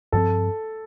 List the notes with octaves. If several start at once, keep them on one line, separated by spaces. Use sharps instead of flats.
G2 F3 C4 A4